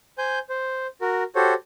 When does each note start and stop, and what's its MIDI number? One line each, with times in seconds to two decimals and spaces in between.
0.18 0.39 72
0.18 0.39 80
0.18 0.39 91
0.50 0.87 72
1.01 1.24 66
1.01 1.24 70
1.36 1.54 66
1.36 1.54 67
1.36 1.54 69
1.36 1.54 72
1.36 1.54 73